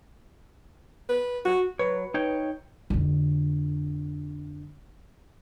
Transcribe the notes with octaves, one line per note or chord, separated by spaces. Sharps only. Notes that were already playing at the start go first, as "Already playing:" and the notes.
B4
F#4
F#3 B4 C#5
D#4 C#5 G5
F2 D3